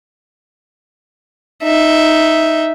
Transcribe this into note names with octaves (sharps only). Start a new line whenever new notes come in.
D#4 E5